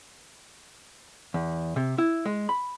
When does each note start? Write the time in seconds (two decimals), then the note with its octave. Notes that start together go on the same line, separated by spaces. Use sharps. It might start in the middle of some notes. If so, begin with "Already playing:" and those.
1.34 E2
1.76 C3
1.98 E4
2.25 G#3
2.49 B5